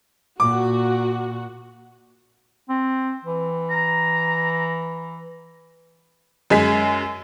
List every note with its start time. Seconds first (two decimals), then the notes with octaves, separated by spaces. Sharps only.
0.40 A#2 F#4 D6
2.69 C4
3.25 E3
3.70 A#5
6.50 F#2 G#3 G#5 B6